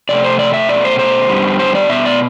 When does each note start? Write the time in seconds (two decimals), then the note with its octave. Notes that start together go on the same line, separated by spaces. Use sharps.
0.09 F2 C3 A3 D5
0.24 C5
0.39 D5
0.53 E5
0.69 B2 A3 D5
0.84 C5
0.99 C5
1.29 G2 D3 G3 B3
1.59 C5
1.75 D5
1.89 B2 B3 E5
2.05 D5